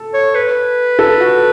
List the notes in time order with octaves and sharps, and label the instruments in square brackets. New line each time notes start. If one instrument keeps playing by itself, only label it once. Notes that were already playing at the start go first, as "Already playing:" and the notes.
Already playing: [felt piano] A4
[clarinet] C#5
B4
[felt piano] A4
F#4